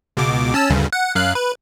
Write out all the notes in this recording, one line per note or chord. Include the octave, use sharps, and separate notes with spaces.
C#2 B2 D6
C#4 A5 E6
D2 G2 C#3
F#5
F#2 F5 F#6
B4